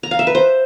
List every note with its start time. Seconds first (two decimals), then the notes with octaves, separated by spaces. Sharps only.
0.03 A#5
0.11 F5
0.19 E5
0.27 B4
0.35 C5